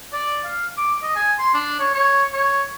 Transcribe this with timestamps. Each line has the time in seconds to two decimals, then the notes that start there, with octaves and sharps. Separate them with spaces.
0.13 D5
0.45 F5
0.78 D6
1.02 D#5
1.16 G#5
1.39 C6
1.54 D4
1.79 C#5
1.94 C#5
2.33 C#5